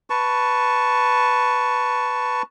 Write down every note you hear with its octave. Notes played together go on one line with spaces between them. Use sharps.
B4 A5 C#6